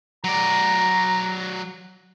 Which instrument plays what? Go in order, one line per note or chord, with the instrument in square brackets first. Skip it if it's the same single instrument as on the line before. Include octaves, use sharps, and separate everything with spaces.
[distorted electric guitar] F#3 D5 [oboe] A#5